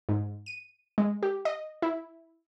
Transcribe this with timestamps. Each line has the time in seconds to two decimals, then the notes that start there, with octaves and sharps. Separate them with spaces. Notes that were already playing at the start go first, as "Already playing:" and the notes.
0.09 G#2
0.46 D#7
0.98 G#3
1.23 G4
1.45 D#5
1.82 E4